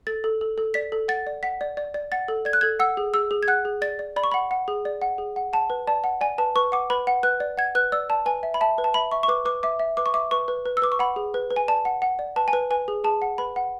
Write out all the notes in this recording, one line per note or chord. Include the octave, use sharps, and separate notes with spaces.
A4 A6
A4
A4
A4
D5 B6
A4
F#5 A6
D5
F#5 B6
D5
D5
D5
F#5 A6
A4
D5 G#6
F#6
A4 G#6
F#5 E6
G#4
G#4 E6
G#4
G#6
F#5 F#6
G#4
D5 A6
D5
D5 B5
C#6
F#5 B5
F#5
G#4
D5
F#5
G#4
F#5
F#5 A5
B4
D5 A5
F#5
D5 G#5
B4 A5
B4 C#6
F#5 D6
B4 B5
F#5
B4 F#6
D5
F#5 G#6
B4 F#6
D5 E6
D5 A5
B4 G#5
E5
B5
E5 A5
B4
A5
E5 B5
E5 C#6
C#6
B4 D6
B4 D6
E5 D6
E5
B4 D6
C#6
E5 D6
B4 C#6
B4
B4
E6
B4 D6
C#6
F#5 B5
G#4
B4
B4
G#5
D5 A5
F#5
F#5
D5
B4 A5
G#5
B4
B4 G#5
G#4
G#4 A5
F#5
B4 B5
F#5